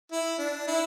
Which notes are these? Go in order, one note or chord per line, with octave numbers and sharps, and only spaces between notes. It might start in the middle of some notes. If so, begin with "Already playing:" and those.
E4
D4
E4